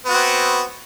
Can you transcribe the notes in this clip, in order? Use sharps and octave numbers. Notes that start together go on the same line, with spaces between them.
B3 C4 F#4